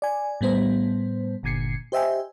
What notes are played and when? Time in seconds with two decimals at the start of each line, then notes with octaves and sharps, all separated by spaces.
0.02 D5 G#5
0.41 A2 G3 B3 C5
1.43 G1 A#2 D3 G#6 C7 C#7
1.92 G4 C5 D#5 E5 G5 G#5